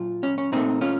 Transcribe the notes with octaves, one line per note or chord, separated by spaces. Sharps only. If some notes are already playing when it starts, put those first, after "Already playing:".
Already playing: A#2 F#3 F4
C#4
C#4
A#2 A3 C4 D#4
C#4 F4